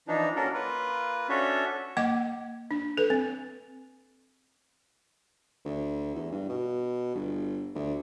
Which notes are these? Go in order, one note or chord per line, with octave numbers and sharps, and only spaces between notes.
E3 F3 D4 D#4
A#3 C#4 D4 F#4 A4 A#4
A#3 F4 B4
C#4 D4 F#4 A4 C#5 E5
A#3 D#5 F#5 D6
D4
A4 B4
C4
D2
E2
G2
B2
G1
D2